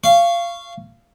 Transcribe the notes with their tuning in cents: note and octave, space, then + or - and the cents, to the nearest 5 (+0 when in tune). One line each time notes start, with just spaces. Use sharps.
F5 -20 C#6 +0